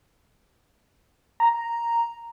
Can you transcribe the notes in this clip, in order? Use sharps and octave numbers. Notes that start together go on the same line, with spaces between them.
A#5